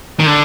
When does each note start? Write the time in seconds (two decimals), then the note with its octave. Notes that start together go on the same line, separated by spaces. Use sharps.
0.20 D#3
0.26 D3